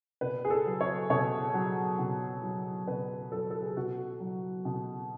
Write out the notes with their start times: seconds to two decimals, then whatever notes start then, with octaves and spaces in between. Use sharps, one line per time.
0.21 B2 B4
0.45 G#4
0.50 A4
0.66 F#3
0.81 C#5
1.10 B2 C#5
1.54 F#3
1.99 B2
2.43 F#3
2.88 B2 B4
3.32 F#3 A4
3.50 A4
3.63 G#4
3.77 B2 F#4
4.20 F#3
4.65 B2